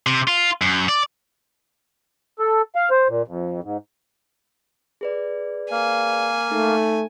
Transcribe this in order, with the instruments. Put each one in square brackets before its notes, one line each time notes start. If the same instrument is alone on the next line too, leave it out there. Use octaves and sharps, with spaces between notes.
[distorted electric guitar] C3
F4
F#2
D5
[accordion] A4
F5
C5
A#2
F2
G#2
[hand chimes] G#4 B4 D5
[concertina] A#3 F5 [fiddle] G#5
[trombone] A3 [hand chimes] D#4